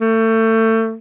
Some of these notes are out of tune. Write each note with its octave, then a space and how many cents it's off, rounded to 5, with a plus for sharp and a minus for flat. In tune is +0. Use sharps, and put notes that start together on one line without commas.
A3 +30